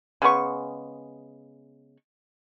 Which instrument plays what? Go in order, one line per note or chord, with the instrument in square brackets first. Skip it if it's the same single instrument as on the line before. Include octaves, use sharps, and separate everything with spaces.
[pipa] C#3 G#3 B3 C#6